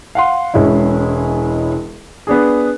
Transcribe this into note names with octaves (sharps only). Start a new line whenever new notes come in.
F5 F#5 C6
E1 G#3 C#4 E4
B3 D4 G#4